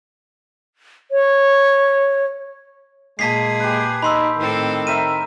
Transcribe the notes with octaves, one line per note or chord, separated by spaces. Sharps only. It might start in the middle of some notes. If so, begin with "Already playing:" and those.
C#5
A#2 G#3 A#3 G#4 A5 B6 C7
G4 B4
D#4 B5 C6 E6
A2 D#3 C4 A4
A#4 C5 E5 D#7